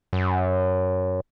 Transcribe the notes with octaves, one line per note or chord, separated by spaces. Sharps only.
F#2